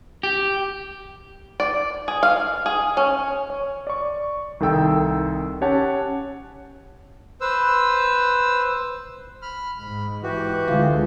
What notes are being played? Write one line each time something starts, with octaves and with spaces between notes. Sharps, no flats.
G4
D5
G#4
F5
G#4
C#4
C#5
D5 C#6
C2 D#3 A4 G5 E6
C#4 G4 C#5 F#5 A5
B4 C5 E6
B5 F6
G#2 B5
E3 F#4 G4
D2 D3 G#3 F4